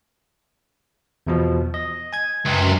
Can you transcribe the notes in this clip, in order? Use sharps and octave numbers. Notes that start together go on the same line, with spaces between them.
E2 B2 F3
D#5
G#5 G#6
C#2 F#2 C3